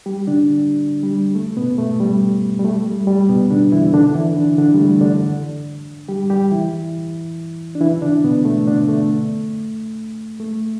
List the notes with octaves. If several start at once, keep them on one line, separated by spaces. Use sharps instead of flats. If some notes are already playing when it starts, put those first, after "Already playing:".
G3 G4
D3 D4
G3
A3
B2 B3
A3
G3
G3
A3
G3
G3
B2 B3
D3 D4
E3 E4
D3 D4
E3 E4
D3 D4
D3 D4
G3
A3
D3 D4
G3 G4
G3 G4
E3 E4
D4
E3 E4
D3 D4
B2 B3
A3
D3 D4
A3
A3